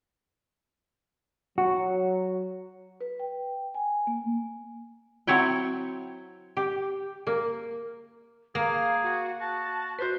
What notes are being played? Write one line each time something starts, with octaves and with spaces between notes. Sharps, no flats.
F#3 F#4
B4
G5
G#5
A#3
F#3 C4 E4 C#5 E5 G5
G4
A#3
A#3 G#4 F5
F#4
F#4 A5
F#4 B4 C5